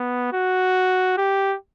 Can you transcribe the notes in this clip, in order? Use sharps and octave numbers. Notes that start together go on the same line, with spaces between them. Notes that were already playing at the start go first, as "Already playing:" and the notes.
Already playing: B3
F#4
G4